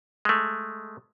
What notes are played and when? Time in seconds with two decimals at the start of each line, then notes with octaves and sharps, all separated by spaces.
0.25 G#3 A3